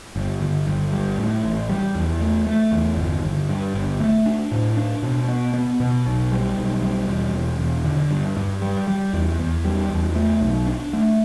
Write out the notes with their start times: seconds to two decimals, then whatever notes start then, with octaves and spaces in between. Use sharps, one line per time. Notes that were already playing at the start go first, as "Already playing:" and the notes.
0.16 G1
0.41 G1
0.67 G1
0.92 G3
1.18 A2
1.43 A1
1.69 G3
1.95 E2
2.21 A3
2.47 A3
2.72 E2
2.97 G1
3.23 G1
3.49 G2
3.75 G1
4.00 A3
4.26 D4
4.52 A2
4.77 D4
5.03 B2
5.28 B3
5.54 B3
5.80 B2
6.06 B1
6.32 G3
6.57 B1
6.82 G3
7.08 E1
7.34 E1
7.59 E1
7.84 D3
8.11 G2
8.37 G2
8.62 G3
8.87 G3
9.13 E2
9.40 E2
9.65 G3
9.90 E2
10.15 A3
10.41 B1
10.67 D4
10.93 A3